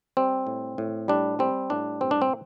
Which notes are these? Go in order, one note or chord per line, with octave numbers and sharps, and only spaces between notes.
G3 C4
A2
A2
G3 D4
G3 C4
A2 D4
G2 C4
D4
C4